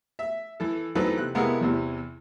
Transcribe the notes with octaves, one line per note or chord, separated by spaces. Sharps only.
E5
E3 A4
E3 F#3 C4 D#4 A4 B4
C3 F#6
C3 G#3 A#3 B3 E4 A#4
E2 C3 E3